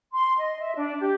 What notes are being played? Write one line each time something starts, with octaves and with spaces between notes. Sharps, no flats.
C6
D#5
E5
D4
G4